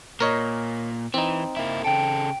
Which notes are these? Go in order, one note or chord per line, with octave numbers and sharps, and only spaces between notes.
A#2 A#4 C#5 D#5
E3 C4 D#4
A#3 E4
C#3 A4 G5 D7